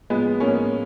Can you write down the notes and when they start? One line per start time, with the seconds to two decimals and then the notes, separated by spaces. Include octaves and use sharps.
0.10 F3 G#3 B3
0.40 F3 A#3 C#4